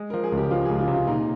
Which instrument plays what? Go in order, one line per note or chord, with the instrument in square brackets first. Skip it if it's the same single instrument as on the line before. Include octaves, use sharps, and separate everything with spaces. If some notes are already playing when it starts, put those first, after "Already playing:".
Already playing: [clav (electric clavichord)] G#3
[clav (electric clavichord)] F3 [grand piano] A#4
[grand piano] G#4
[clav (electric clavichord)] C#2
[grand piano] G4
[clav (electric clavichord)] F3 [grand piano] F4
[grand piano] G#4
[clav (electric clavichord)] C#2
[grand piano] F4
[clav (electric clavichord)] C3
[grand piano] F4
[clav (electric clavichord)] A#2 [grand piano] D#4